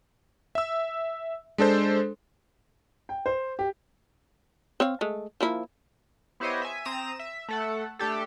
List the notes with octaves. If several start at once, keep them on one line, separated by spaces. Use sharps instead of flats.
E5 E6
G#3 D4 A4 C5
G5
C5
G4
C4 C#5 F5
G#3 A3
F3 A#3 E4
B3 E4 G4 C5 C#5 D#5
E5 G#5
C4 A#5 D#6 E7
E5
A3 A4 F#5
A3 D4 G4 A4